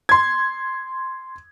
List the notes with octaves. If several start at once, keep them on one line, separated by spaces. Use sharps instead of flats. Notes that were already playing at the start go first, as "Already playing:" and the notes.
C6 G#6